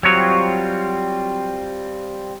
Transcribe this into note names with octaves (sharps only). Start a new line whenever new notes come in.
F#3 G3 C4 F4 C#5